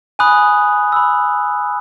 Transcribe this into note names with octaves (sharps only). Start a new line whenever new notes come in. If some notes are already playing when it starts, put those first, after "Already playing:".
G#5 B5 D#6 F#6
B5 E6